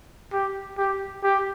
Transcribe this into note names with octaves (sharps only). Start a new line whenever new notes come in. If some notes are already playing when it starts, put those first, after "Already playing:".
G4
G4
G4